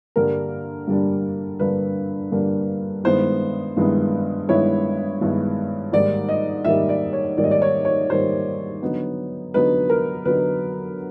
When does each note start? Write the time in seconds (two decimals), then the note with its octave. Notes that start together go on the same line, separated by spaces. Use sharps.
0.16 G2 D3 G3 A#3 D4 A#4
0.87 G2 D3 G3 A#3 D4
1.59 G2 D3 G3 A#3 D4 B4
2.32 G2 D3 G3 A#3 D4
3.04 G2 D#3 G#3 B3 E4 C5
3.77 G2 D#3 G#3 B3 E4
4.48 G2 D#3 G#3 B3 E4 C#5
5.21 G2 D#3 G#3 B3 E4
5.92 G#2 D#3 G3 A#3 D5
6.29 D#5
6.64 G#2 D#3 G3 A#3 E5
6.89 D5
7.13 C#5
7.37 G#2 D#3 G3 A#3 D5
7.44 D#5
7.51 D5
7.62 C#5
7.85 C#5
8.09 G#2 D#3 G3 A#3 C5
8.82 D3 F#3 B3 D#4
9.54 D3 F#3 B3 D#4 B4
9.90 A#4
10.25 D3 F#3 B3 D#4 B4